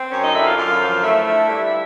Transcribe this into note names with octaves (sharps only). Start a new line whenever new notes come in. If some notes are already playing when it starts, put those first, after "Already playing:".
Already playing: C4
F#2 C#4 C#5
D#4 D#5
D3 E4 E5
F4 F5
F#2 F4 F5
F3
A3 E4 E5
D3
G2